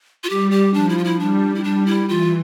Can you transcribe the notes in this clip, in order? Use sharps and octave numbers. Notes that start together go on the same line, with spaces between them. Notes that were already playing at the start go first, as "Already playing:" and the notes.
F4
G3 G4
G4
F3 D4
E4
F4
E4
G3 D4
E4
G3 D4
E4
E3 F4